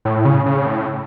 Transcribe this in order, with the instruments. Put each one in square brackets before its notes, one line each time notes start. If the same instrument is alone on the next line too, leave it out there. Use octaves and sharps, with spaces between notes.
[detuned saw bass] A2
C#3
C#3
A2